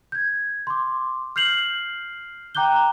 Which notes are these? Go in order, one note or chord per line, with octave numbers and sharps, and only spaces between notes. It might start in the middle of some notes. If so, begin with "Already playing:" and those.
G6 G#6
C6 D6
F6 G6 C7 F7 F#7
G5 A#5 D6 F#6 G6 G7